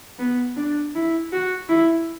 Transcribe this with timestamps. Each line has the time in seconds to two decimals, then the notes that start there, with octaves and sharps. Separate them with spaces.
0.19 B3
0.57 D4
0.95 E4
1.33 F#4
1.69 E4